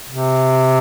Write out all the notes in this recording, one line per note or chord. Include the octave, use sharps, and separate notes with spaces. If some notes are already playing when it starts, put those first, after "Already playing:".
C3